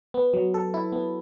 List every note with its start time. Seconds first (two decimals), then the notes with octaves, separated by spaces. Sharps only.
0.14 B3
0.34 F#3
0.54 A4
0.74 E4
0.92 B3